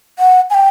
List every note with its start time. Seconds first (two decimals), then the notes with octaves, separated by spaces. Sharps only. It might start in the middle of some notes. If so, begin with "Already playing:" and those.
0.19 F#5
0.50 G#5
0.54 G5